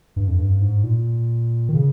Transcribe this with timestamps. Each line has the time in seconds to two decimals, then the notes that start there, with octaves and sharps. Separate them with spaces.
0.16 G2
0.28 F2
0.39 G2
0.61 G#2
0.84 A#2
1.69 D#3
1.74 C#3